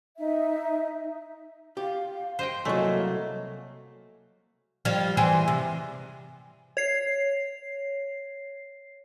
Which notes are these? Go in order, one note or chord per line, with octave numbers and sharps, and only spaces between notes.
D#4 E5
G4 F5
C5 D#5 G5
C2 F#3 A3 A#3 G#4 C#5 D#5
F3 G3
E3 G#4 C5
C3
C#5 C7